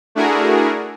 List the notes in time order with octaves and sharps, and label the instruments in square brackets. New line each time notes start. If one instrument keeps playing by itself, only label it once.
[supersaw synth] A3 D4 E4 F#4 G#4 A#4